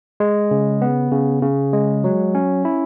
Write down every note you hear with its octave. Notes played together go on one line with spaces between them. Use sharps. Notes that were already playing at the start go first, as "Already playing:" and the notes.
G#3
C#3
B3
C#3
C#3
G#3
F#3
C#4
E4